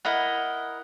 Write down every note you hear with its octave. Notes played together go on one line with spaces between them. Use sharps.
E4 A#4 D#5 F#5